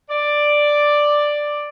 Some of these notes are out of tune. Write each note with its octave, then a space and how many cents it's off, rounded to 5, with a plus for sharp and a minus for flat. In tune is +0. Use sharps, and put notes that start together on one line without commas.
D5 +5